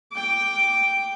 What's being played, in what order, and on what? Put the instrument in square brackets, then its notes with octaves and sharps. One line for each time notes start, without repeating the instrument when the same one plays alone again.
[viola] G5 D6